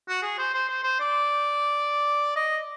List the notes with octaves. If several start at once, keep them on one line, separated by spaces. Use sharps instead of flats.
F#4
G#4
C5
C5
C5
C5
D5
D#5